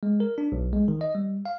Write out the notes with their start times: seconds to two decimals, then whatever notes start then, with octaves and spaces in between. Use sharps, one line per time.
0.03 G#3
0.20 A#4
0.38 D4
0.52 B1
0.73 G#3
0.88 D#3
1.01 D#5
1.15 G3
1.46 F5